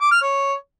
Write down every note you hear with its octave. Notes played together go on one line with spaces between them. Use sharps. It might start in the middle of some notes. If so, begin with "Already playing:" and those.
D6
F6
C#5